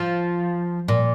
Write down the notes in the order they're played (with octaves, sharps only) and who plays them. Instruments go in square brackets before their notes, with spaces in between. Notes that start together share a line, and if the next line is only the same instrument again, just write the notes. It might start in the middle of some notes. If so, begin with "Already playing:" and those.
Already playing: [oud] F3
A#2